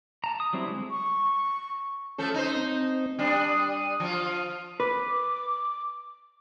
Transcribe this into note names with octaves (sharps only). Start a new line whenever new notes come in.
A5 A#5
D#6
F#3 G3 C4 E4
D3 G#3
C#6
F3 A3 C#4 A4
D#4 C5
C4
G3 D4 D#6
F3 F4
B4 D6